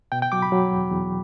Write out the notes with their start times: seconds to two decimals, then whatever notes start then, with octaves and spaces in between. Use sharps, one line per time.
0.12 B2 G5
0.22 G5
0.32 F#3 D6
0.42 B5
0.52 F#3
0.72 E2
0.92 E2